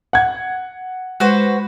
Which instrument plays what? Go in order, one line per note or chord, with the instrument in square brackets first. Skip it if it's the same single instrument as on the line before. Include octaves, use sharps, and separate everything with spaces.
[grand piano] F#5 G#6
[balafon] G#3 [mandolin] F#4 B4 C5